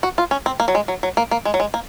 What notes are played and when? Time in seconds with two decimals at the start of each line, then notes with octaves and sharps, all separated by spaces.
0.03 F#4
0.18 F4
0.31 C#4
0.46 C4
0.60 A#3
0.68 F#3
0.75 G#3
0.88 F#3
1.03 F#3
1.17 A#3
1.31 A#3
1.45 G#3
1.54 F#3
1.60 G#3
1.74 A#3